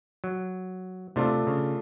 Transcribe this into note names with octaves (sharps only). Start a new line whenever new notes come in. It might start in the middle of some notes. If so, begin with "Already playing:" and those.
F#3
C3 A3 D4 F4
C#3